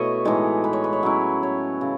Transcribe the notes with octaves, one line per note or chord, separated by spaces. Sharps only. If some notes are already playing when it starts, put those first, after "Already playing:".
Already playing: B2 A3 B3 E4 C#5 D#5
A2 E3 G#3 D#4
B4
C#5
B4
C#5
F#3 C#4 E4
C#5
C#3